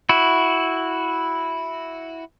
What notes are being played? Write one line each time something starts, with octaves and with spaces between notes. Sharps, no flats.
E4 F#4